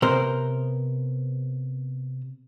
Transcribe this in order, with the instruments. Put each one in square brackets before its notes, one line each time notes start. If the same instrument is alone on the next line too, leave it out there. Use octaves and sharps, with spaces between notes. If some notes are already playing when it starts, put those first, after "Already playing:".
[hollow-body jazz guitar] C3 B3 A#4 C5